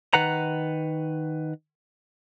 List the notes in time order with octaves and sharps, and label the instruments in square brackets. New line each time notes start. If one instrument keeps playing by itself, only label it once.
[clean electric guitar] D#3 B4 F#5 A#5